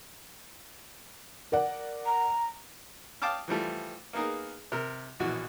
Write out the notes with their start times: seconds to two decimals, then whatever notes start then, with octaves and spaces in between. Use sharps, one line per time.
1.52 A#4 D5 F#5
2.06 A#5
3.22 F5 G5 A5 D6 D#6 F6
3.48 E3 F3 G3 A3
4.13 A#3 B3 D#4 G#4 A#4
4.72 C3 A#4
5.20 A#1 B2 E3 F#4